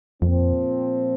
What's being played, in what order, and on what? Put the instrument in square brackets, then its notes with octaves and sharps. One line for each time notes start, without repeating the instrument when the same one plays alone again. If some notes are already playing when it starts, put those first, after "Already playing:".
[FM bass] F2 [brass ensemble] A#2 F3 C4